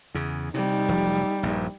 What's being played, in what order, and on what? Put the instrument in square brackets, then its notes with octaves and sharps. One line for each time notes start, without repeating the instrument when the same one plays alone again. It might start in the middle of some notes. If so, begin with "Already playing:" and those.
[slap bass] E2 C#3
[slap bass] C3 [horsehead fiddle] G3 D#4
[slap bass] F1 F3 F#3
A#1 G2